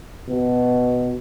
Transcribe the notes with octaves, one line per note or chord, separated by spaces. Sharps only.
B2